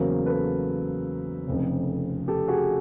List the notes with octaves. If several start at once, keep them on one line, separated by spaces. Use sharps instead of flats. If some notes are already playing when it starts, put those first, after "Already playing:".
Already playing: E2 C#3 F#3 A#3 A#4 C5
A4 B4
F1 F2 C#3
G4 A4
F#4 G#4